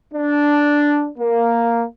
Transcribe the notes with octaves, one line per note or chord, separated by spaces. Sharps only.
D4
A#3